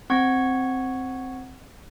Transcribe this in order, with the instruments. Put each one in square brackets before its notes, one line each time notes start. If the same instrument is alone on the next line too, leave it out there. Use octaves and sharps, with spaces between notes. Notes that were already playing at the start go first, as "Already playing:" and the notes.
[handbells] C4 F#5 C#6 G#6